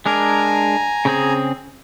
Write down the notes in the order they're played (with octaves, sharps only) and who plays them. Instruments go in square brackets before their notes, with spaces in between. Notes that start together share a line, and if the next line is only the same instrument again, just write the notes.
[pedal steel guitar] G#3 D4 A#4 [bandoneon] G#5 A#5
[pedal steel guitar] C#3 C4 G#4